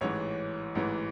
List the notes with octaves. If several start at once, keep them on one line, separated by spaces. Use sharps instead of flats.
A1 G#2 E3 C#5
A1 G#2 E3